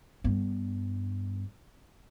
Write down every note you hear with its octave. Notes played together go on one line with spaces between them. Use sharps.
G2 B3